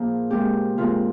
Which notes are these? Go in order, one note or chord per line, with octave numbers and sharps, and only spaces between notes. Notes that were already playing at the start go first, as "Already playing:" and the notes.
Already playing: A#2 F3 A#3 G#4
A#2 G#3 C4 G4
A#2 F3 G#3 C4 F4